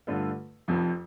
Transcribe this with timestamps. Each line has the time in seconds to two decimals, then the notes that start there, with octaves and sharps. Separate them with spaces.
0.07 G2 D3 A3 F4 A4
0.68 F1 F2 F3